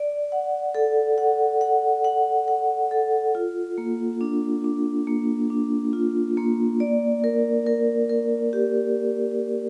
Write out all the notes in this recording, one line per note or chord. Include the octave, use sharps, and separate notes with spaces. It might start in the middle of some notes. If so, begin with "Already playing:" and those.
Already playing: D5
F#5
A4
F#5
F#5
F#5
F#5
A4
F4
A#3
D4
D4
A#3
D4
F4
A#3
D5
A#4
A#4
A#4
G4